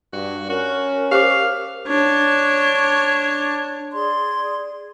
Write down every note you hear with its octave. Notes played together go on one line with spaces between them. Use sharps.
G2 F#4
C#4 F#4 A#4
G4 C5 F5 D6
D4 C#5
G#4 D5 C6